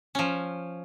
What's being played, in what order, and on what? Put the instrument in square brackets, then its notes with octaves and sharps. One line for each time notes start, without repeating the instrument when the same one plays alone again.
[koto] F3 C#4